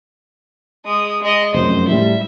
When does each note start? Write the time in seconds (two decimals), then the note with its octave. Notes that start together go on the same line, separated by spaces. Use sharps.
0.85 G#3 D#6
1.21 G#3 D#5
1.54 F1 F#2 C5
1.88 A2 G3 E5